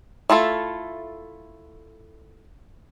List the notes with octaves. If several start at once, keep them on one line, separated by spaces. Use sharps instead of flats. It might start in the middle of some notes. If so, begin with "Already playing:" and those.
A3 E4 F4 A4